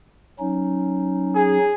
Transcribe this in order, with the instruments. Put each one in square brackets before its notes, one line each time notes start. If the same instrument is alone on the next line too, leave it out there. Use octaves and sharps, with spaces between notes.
[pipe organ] F#3 C#4 D#4
[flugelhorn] G#4